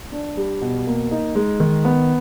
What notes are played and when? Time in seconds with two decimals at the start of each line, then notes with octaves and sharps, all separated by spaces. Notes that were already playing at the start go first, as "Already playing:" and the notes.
0.12 D4
0.37 G3
0.61 B2
0.87 A#3
1.11 D#4
1.35 G#3
1.60 D#3
1.85 B3